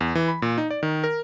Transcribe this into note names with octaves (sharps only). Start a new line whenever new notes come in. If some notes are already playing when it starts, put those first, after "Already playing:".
E2
E3
B5
A#2
D#4
D5
D#3
A#4